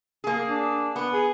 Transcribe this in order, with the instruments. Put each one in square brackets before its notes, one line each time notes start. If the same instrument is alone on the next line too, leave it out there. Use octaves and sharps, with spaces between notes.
[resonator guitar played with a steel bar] A#3 G#4
[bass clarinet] D4
[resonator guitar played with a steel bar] B3
[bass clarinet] G#4